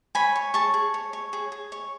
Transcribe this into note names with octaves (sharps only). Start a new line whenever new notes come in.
C#5 G#5 B5
C#5
G#4 A5 C#6
G#4
C#5
C#5
G#4
G#4
C#5